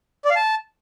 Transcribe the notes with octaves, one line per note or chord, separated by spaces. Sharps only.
D5
F5
A5